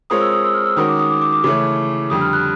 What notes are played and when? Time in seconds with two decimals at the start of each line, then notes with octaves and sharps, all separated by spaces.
0.10 G#3 C4 F4 A#4 C#5 D#6
0.21 E6
0.32 D#6
0.44 E6
0.54 F6
0.66 E6
0.77 D#3 G#3 C#4 F#4 A#4 D#6
0.89 D6
1.00 D#6
1.10 D6
1.22 D6
1.33 D6
1.44 C#3 E3 A3 C#4 D6
2.10 F2 D3 G3 D#6
2.21 F6
2.33 F#6